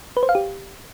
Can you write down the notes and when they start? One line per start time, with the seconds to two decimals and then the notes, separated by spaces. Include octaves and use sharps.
0.17 B4
0.23 C5
0.29 F5
0.35 G4